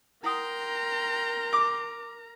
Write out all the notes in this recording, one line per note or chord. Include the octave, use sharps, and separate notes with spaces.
E4 A#4 F#5 G5 A#5 C6 D#6
D6